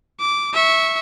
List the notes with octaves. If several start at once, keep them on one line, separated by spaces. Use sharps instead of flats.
D6
E5 C#6